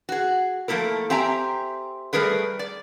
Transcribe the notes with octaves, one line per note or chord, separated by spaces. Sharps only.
F#4 G#4
F3 A3 A#3 E4 A#4
C4 G4 E5 G#5 A#5
G3 A3 G#4 A#4 B4
D5